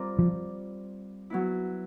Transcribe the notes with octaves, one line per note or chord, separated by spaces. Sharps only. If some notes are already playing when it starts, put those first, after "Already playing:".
Already playing: G3 C4 F4 A#4 D5
F3
F#3 B3 E4